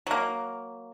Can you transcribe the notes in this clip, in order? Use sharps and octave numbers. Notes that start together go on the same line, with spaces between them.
F#3 A#3